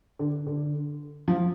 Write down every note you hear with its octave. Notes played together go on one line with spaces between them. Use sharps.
D3
D3
F3